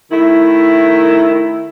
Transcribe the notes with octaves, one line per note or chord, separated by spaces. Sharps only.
D#3 A3 E4